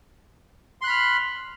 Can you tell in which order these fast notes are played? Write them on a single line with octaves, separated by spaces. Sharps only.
C6 F#6 B5 F6